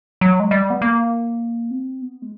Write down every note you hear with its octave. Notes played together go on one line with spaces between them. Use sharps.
F#3
G#3
G3
B3
A#3
C4
B3
G#3